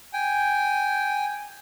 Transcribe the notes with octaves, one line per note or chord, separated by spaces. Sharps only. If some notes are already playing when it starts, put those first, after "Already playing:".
G5 G#5